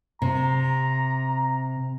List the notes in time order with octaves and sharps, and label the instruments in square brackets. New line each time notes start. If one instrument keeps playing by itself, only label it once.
[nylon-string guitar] C3 [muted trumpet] A#5